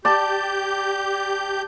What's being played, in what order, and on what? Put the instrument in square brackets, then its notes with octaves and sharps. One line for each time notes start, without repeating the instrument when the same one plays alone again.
[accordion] G4 G6 [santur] D5 A5